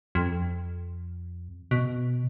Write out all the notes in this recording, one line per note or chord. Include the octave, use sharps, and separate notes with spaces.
F2
B2